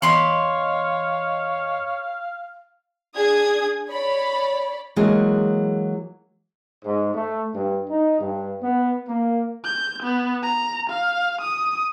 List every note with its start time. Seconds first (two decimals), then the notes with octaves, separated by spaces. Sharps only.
0.02 E2 C#5 D#5 F5 B5 C6 D6
3.15 D4 G#4 D#6 G#6
3.89 C#5 D5 B5
4.96 E3 F#3 G#3 A#3 G#4
6.84 G#2
7.14 A3
7.53 G2
7.89 D#4
8.19 G2
8.62 B3
9.07 A#3
9.64 G6
10.03 B3
10.43 A#5
10.89 F5
11.41 D#6